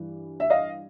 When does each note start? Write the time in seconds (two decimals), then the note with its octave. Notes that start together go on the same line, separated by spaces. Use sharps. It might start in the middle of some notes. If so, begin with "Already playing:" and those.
Already playing: G2 E3
0.40 E5
0.50 D#5 F5